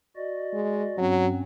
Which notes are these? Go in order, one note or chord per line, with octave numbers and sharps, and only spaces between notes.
F#4 D5 D#5
G#3
G2 F#3 C4 C#4